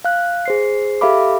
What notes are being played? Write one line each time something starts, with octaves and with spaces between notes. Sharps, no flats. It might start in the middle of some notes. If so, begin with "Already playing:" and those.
F5 F#6
G#4 C5 C7
G4 A4 E5 F5 B5 D6